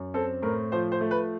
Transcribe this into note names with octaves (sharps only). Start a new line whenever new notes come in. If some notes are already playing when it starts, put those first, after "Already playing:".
Already playing: F#2
C4 A4
A2 A#4
F3 C5
C5
A3
B4